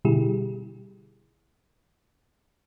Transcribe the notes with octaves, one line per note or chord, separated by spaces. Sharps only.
B2 D3 G3 E4 G4 G#4